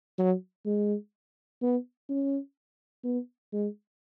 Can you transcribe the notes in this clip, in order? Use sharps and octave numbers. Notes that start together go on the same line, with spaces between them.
F#3
G#3
B3
C#4
B3
G#3